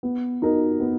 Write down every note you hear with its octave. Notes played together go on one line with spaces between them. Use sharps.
B3
D#4 F#4 A#4
B3